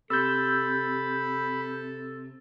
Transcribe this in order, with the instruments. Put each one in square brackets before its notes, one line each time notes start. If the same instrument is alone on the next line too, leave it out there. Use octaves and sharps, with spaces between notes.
[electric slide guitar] C3 [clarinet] A4 [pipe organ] B5 [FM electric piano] E6 G6